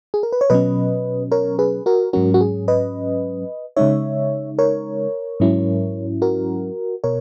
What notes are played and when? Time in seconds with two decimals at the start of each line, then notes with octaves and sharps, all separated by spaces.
0.14 G#4
0.23 A#4
0.32 B4
0.41 C#5
0.50 B2 F#3 C#4 B4 D#5
1.32 A#4 C#5
1.59 G#4 B4
1.86 F#4 A#4
2.13 G#2 F#3 C#4 F#4 A#4
2.34 F#4
2.41 G#4
2.68 B4 D#5
3.77 C#3 G#3 D#4 C#5 E5
4.58 A#4 C#5
5.40 G#2 F#3 C#4 E4
6.22 F#4 A#4
7.04 B2 A#4 C#5